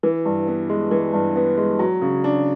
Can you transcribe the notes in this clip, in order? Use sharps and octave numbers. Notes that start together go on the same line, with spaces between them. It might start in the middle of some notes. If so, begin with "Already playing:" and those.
E3
G2
B3
G#3
E3
G2
B3
G#3
F#3
C#3
D4